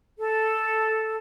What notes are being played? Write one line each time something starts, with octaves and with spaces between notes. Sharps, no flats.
A4